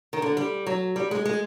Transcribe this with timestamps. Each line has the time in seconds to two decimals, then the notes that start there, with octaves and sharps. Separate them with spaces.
0.13 D#3
0.22 D3
0.37 G3
0.67 F#3
0.96 G3
1.11 G#3
1.25 G#3